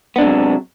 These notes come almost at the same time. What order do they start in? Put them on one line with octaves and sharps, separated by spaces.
B3 D4 G#3 C3 F#3